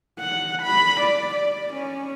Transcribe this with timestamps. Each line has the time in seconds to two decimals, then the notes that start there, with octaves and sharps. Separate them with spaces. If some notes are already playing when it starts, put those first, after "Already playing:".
0.19 F#5
0.62 B5
1.00 D5
1.35 D5
1.73 C#4